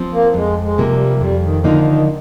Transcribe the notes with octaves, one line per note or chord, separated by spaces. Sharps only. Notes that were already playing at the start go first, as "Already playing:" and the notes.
Already playing: F3 C4
A#3
F2 G#3
G#3
C3 F3 A#3
G3
F2 G3
D#3
D3 D#3 F3 A#3 D#4
D#3